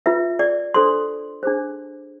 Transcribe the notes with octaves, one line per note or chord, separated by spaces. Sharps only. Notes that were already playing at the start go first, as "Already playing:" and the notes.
F4 B4 E5
D5
D4 A4 C5 C6
D4 G#4 C5